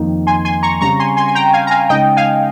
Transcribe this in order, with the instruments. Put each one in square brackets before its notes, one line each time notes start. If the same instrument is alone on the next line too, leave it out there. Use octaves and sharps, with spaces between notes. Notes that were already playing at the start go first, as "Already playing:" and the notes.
Already playing: [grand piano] F2 D#3 A#3 D#4
[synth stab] G#5 C6
G#5 C6
A#5 C#6
[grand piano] C#3 G3 C4 [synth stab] A#5 C#6
[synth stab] G#5 C6
G#5 C6
G#5
G5 A#5
F5 G#5
A#5
F5 G#5
[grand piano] C#3 G#3 D#4 [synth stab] D#5 G5
[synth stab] F5 G#5